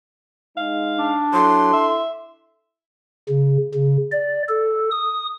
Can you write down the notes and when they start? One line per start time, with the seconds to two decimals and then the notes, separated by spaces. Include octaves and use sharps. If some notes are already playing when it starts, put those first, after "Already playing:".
0.57 G#3 D#4 F5
0.98 D4
1.33 F#3 E4 A4 C6
1.73 E5
3.29 C#3
3.74 C#3
4.12 D5
4.49 A4
4.91 D#6